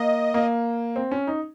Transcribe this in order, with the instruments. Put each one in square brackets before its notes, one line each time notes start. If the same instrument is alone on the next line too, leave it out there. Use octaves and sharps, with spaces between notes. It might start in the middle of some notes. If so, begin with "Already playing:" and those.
Already playing: [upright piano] A#3 [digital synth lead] D#5
[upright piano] A#3
C4
C#4
D#4